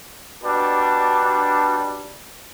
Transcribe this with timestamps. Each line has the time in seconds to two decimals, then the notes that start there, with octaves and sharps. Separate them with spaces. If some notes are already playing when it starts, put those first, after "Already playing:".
0.43 B2 G3 D4